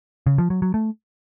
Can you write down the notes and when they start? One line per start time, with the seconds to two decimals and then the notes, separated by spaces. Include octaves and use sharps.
0.27 C#3
0.38 F3
0.50 F#3
0.62 F#3
0.74 A3